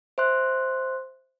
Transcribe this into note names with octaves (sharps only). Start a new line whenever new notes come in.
C5 E5 C6 F#6